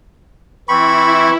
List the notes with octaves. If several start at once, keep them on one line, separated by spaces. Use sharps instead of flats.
E3 C4 E4 B5 C#6